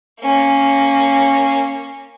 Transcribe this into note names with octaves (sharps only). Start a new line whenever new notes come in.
A#3 C#4